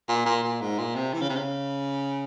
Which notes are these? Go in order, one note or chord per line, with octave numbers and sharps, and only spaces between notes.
A#2
A#2
A#2
G#2
A#2
C3
E3
C#3
C3
C#3